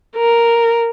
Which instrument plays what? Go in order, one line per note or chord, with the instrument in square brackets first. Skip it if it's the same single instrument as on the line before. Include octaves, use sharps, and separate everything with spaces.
[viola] A#4